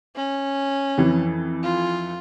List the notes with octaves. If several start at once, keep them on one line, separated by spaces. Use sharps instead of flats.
C#4
F2 E3
F4